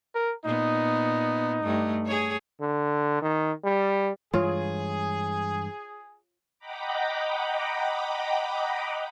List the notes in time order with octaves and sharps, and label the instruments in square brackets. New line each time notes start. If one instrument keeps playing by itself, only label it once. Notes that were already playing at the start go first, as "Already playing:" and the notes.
[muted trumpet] A#4
[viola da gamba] A#2 B3 [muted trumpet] D#4
[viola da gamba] G2 A3
G#4 C#5
[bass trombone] D3
D#3
G3
[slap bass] G2 E3 G#3 [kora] F4 [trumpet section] G#4 [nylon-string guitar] C#5
[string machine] D#5 F#5 G5 A#5 B5 D6